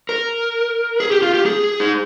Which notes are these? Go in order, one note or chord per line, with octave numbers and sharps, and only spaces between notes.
A#4
G#4
G4
F4
G4
G#4
D#4